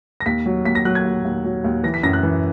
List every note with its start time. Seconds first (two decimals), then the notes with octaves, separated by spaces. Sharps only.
0.20 A#6
0.26 D#2 B6
0.46 F#3
0.65 D#2 B6
0.75 A#6
0.85 F#3 F#6
0.95 G#6
1.05 D#2
1.25 D#2
1.44 F#3
1.64 D#2
1.83 E3 A#6
1.94 B6
2.03 F#2 A#6
2.13 F#6
2.23 E3